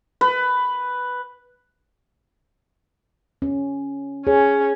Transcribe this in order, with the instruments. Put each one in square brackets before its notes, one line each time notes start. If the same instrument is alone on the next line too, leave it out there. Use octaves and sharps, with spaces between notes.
[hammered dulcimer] B4
[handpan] C#4
[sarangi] C#4 [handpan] G#4 C#5